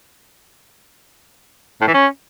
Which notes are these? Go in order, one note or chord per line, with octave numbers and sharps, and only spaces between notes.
A2
E3
C#4